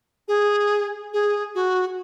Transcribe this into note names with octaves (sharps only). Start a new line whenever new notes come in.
G#4
G#4
F#4